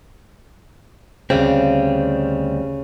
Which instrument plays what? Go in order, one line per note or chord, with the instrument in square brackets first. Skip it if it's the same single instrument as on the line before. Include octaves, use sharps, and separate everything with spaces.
[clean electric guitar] D2 G3 C4 [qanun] C#3